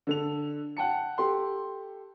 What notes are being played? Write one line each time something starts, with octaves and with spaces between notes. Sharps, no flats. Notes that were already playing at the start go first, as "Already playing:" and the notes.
D3 A4 F7
F#5 G5 A5 C#7
G4 A4 C6